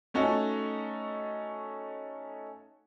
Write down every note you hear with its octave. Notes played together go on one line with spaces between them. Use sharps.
A3 C#4 D#4 F#4 A4